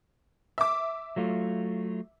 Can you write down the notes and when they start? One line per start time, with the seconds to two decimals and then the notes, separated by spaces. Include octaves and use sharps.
0.58 E5 D6
1.16 F#3 A3 F4